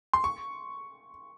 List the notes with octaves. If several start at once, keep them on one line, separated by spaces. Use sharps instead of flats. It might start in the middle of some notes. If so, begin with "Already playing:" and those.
C6
C#6